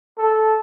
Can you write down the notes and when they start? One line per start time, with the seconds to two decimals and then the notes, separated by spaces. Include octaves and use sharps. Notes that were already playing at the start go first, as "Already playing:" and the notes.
0.18 A4